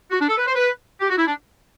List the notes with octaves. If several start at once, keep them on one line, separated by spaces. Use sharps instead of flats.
F#4
D4
A4
B4
C5
B4
G4
F#4
E4
D4